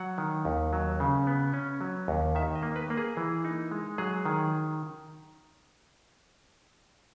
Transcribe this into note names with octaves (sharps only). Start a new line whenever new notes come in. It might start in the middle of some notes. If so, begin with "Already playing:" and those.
Already playing: F#3 F#5
D#3
D#2
F#3
C#3
B3
C#4
F#3
D#2
D#3 E5
D#5
A#3
B4
A#3
G#4
E3
D#4
G#3
F#3 G#4
D#3